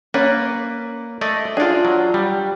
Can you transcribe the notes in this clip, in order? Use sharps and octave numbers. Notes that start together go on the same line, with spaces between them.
A#3 C#4 B4 D5
A3 D5 D#5
D4 F4 G#4 D5
F#3
G3